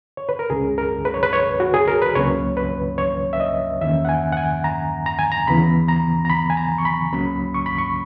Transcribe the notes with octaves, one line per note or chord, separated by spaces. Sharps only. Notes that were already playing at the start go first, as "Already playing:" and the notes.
C#5
B4
A#4
C#2 C#3 G#3 C#4 G#4
A#4
B4
C#5
B4
C#5
F#4
G#4
A#4
B4
C#2 C#3 F#3 A#3 C#4 C#5
B4
C#5
E5
D#5
E2 D#3 A#3 C#4 E5
F#5
G#5
F#5
G#5
A#5
A#5
G#5
A#5
D#2 C#3 E3 B3 B5
A#5
A#5
B5
G#5
A#5
C#6
B5
C#2 C#3 F#3 A#3 C#4 B5
C#6
B5
C#6